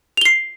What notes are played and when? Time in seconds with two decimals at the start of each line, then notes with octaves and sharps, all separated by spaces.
0.17 F7
0.21 G7
0.25 C7